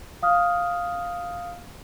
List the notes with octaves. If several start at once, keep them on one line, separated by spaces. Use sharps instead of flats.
F5 D#6 F6